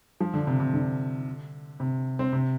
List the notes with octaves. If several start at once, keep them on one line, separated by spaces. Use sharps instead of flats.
F3
D3
C3
C3
D3
C3
C4
C3